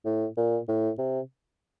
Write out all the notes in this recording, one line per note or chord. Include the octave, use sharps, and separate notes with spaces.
A2
A#2
A2
C3